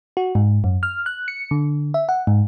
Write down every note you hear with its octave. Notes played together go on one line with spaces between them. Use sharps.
F#4
G#2
F#2
F6
F#6
C#7
D3
E5
F#5
G#2